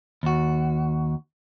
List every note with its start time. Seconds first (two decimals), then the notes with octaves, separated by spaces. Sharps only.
0.23 D#2 F#4